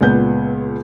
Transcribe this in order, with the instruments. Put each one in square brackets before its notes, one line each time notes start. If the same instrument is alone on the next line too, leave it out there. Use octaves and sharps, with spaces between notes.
[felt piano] C#2 A#2 B3 G6